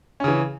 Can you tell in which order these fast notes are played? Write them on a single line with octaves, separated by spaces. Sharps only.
C#4 C#3 E3